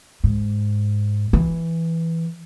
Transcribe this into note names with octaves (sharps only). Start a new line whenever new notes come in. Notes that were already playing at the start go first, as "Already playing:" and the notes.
G#2
E3